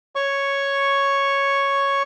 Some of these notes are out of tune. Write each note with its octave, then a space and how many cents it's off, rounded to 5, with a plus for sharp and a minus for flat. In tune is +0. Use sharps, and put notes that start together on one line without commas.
C#5 +0 C#6 +0